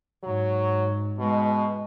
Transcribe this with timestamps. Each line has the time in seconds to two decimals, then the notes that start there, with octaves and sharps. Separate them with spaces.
0.23 G#2 F#3
1.19 B2 G#3